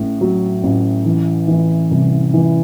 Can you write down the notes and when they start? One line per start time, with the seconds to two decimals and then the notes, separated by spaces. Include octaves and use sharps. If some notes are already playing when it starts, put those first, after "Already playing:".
Already playing: A1 A2
0.21 F#3
0.63 A1
1.05 E3
1.48 E3
1.91 C2
2.34 E3